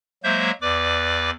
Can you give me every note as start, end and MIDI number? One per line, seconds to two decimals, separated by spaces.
0.24 0.51 54
0.24 0.51 56
0.24 0.51 58
0.24 0.51 72
0.24 0.51 76
0.24 0.51 91
0.61 1.31 40
0.61 1.31 71
0.61 1.31 74
0.61 1.31 86